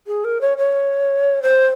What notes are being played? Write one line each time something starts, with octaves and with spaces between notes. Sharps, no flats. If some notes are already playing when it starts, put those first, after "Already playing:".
G#4
A#4
C#5
C#5
C5